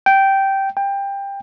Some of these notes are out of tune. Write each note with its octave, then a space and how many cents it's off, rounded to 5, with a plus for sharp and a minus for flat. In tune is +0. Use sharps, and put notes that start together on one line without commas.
G5 -10
G5 +20